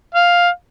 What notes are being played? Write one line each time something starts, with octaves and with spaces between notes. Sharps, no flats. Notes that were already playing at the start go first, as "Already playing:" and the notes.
F5